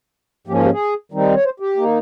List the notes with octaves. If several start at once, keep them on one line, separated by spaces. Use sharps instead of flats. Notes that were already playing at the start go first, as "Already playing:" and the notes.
G#2 F3 A#3 C#4 G4
F4
G4
G#4
D#3 G3 C4 D#4
C#5
C5
G4
D#3 A#3 D#4